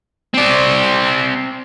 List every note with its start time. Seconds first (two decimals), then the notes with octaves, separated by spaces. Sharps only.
0.34 C4 D5